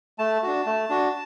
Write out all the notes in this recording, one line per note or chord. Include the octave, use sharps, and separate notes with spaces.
A3 A5
D4 F#4
A3
D4 F#4